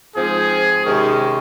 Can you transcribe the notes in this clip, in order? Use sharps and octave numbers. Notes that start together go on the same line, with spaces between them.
G#2 F3 C4 G#4
C3 D#3 G#3 C#4